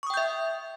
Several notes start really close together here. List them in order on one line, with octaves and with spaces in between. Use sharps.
C#6 D#6 G5 G6 E5